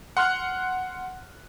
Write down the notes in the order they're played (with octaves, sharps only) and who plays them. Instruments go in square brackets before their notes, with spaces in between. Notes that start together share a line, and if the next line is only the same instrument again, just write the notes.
[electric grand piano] F#5 C6 F6 F#6